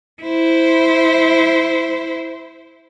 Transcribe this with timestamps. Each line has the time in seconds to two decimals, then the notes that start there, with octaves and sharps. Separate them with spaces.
0.22 E4 C5